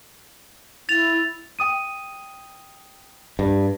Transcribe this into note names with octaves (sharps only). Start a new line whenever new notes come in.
E4 A6 F7
G5 D#6 D#7
G2